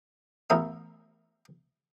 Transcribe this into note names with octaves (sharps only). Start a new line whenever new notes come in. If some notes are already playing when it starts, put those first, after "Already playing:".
A1 E2 A#4 E5 D#6